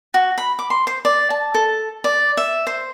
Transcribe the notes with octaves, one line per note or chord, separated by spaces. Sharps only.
F#4
B5
D6
C6
C5
D5
A5
A4
D5
E5
C5